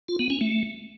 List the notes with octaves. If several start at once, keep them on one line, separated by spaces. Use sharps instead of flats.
F4
B3
C#4
A3